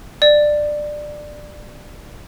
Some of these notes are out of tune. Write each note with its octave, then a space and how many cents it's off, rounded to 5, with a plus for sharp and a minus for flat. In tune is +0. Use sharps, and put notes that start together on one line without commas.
D5 +15